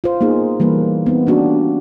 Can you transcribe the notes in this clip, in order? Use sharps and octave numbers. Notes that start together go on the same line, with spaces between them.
F4 C5
A#3 B3 D#4 G#4
E3 G3 A#3 B4
B3 C4 D#4
A#3 C#4 D4 F#4 G4